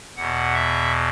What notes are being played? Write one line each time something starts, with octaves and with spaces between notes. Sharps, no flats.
E2 B2 F#5
E5